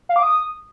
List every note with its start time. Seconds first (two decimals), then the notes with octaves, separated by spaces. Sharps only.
0.09 F5
0.16 D6
0.23 D#6